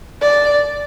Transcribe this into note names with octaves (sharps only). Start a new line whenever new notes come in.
D5